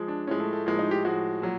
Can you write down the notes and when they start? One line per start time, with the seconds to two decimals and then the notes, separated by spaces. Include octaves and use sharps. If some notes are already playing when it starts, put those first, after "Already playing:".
Already playing: F3 G#3
0.08 D4
0.27 A2 F3 G#3 C#4
0.40 A3
0.53 A3
0.66 A2 F3 G#3 A#3
0.79 D#4
0.91 G4
1.05 A2 F3 G#3 F#4
1.42 A#2 F#3